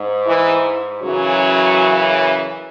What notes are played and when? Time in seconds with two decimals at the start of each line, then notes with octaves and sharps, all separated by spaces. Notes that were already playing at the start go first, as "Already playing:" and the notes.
Already playing: G#2
0.27 E3
1.01 F#2 C#3 E3 F#3